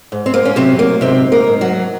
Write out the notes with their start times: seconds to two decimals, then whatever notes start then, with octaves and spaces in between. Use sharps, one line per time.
0.12 G#2
0.26 C4
0.34 A#3
0.45 C#4
0.56 C3 F#3 C4
0.79 A#3
1.01 G#2 C3 C4
1.32 A#3 A#4
1.46 G#2
1.61 F#3 F#4